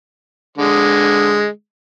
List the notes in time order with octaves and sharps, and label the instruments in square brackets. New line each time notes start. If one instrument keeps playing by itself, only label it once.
[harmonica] D3 G#3